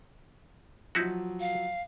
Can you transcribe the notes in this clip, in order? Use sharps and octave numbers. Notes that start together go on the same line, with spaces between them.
F3 F#3 D#4 E4 F#4
F5